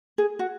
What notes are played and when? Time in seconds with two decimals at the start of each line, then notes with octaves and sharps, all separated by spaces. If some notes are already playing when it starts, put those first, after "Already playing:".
0.18 G#4
0.39 F#4